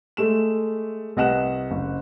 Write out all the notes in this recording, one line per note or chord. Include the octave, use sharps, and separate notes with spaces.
G#3 A3 E7
C2 B4 D#5 F#5 F#6 E7
F#1